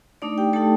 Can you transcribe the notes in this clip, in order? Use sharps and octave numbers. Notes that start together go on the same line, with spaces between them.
A3 D4 D#4 D5
G4 G5
A3 D#4 A4 A5